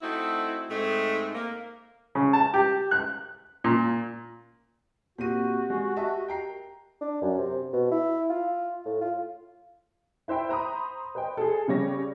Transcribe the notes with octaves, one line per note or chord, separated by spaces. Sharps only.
A3 C4 D#4 E4 F#4
G#2 G#3 A3 C4 D#5
A#3
C#3
A5
G4
F#6
A#2
A#2 C4 F#4 G4 A#4 D#7
G#3
D#5 E5 A5
G5 A#5 C7
D4
F#2
C3
B2
E4
F4
A2
F4
E4 C5 E5 G5 B5
C5 A#5 B5 D#6
B4 C5 D#5 G5
G#4 A4
C#3 G3 C#5 A#6